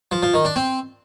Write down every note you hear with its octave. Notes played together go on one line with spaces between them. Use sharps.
F3
F3
D#3
D4
C4